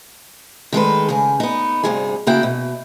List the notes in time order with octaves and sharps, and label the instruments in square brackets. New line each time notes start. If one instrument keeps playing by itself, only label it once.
[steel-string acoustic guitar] D#3 G#3 A4 B4
C#3 G#4
B3 D#4
D2 G2 C3 D#4 G#4
C#3 A#3 E4 F#4 G5
B2